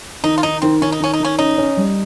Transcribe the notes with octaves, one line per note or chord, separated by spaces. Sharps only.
D#3 D#4
F4
D#3 D#4
D#3 C4
D#3 C#4
D#4
D#3 C#4
D#4
D#3 C#4
C#4 D#4
C#4
G3